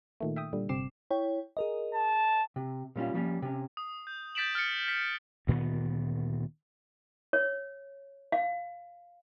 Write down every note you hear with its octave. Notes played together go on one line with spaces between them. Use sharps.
A#2 D#3 A3
E5 G5 D#6
A#2 D3 G3
G1 C3 C4 D6 C7 E7
E4 C#5 G5
G#4 A#4 D#5
A5
C3
A#2 G3 C#4 F4
F3 G3 A#3 C#4
C3 C#4
D#6
G6
G6 A6 B6 D7 E7 F#7
F6 A6 C#7
B6
D2 A#2 D#3 B3
C#5
F5